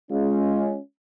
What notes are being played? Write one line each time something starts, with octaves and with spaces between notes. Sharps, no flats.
G#3 C#4 F4